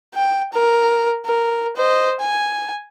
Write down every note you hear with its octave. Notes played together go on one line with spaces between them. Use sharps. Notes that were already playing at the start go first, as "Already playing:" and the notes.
G5
A#4
A#4
C5 D#5
G#5